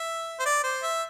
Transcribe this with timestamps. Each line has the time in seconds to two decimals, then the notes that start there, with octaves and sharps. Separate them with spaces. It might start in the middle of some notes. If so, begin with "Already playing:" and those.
Already playing: E5
0.40 C5
0.46 D5
0.64 C5
0.83 E5